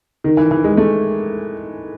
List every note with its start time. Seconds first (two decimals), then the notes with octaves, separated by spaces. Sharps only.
0.24 D#3
0.37 E3
0.51 E3
0.64 G#3
0.77 A3